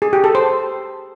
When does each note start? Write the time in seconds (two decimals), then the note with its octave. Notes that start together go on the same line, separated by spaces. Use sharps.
0.02 G#4
0.13 G4
0.24 A4
0.35 C5